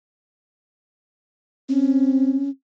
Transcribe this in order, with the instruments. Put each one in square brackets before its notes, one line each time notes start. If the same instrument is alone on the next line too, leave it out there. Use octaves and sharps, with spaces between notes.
[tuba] C4 [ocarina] C#4